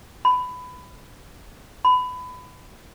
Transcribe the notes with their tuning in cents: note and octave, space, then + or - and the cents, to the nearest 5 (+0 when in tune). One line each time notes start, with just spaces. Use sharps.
B5 +20
B5 +25